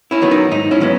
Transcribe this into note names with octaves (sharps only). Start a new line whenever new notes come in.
C#4 E4
D#3 F#3 B3
D#4
G#2 D#4
C#4 E4
D#3 F#3 B3